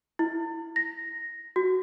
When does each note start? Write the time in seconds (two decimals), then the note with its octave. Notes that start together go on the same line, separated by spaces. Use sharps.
0.19 E4
0.76 A#6
1.56 F#4